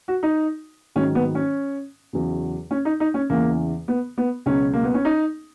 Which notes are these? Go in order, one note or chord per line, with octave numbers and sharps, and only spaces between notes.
F#4
D#4
G#2 D#3 F#3 C#4
B3
C#4
E2 C#3 F#3
C#4
D#4
D#4
C#4
E2 C#3 E3 A#3
B3
B3
C#2 B2 F#3 C#4
A#3
B3
C#4
D#4